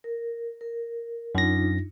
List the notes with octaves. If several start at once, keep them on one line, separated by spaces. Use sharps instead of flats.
A#4
A#4
F#2 D4 D#4 F4 A#6